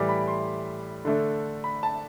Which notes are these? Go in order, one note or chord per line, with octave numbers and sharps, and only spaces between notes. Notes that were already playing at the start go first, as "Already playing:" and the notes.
Already playing: A2 E3 G3 D6
B5
C6
D3 A3 D4
B5
A5